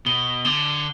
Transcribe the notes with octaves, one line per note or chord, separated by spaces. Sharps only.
B2 G7
D3 G7